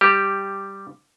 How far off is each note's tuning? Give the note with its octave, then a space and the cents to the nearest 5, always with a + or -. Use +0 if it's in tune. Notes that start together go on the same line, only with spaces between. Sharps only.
G3 +0 G4 +0